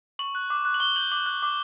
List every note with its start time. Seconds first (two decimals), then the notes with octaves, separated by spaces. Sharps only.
0.19 C#6 F#7
0.35 F#6
0.50 D6
0.65 F#6
0.74 F#7
0.80 C#6 G7
0.96 G6 F#7
1.12 D6 F#7
1.26 F#6
1.43 D6